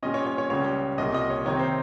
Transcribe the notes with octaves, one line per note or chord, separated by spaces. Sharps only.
A#2 G3 C#4 D#5
C#5
C#5
C#5
C#2 C#3 G3 C#4 C#5
C2 A#2 G3 D#5
D#5
C#5
C3 D#3 G3 C4 D#4 C#5
C5